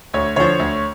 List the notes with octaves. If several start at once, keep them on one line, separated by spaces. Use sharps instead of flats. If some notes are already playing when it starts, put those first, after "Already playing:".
D2 C#5
D3 F3 C#5
D2